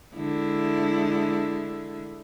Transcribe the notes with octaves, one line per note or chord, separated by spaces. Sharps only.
D3 G#3 E4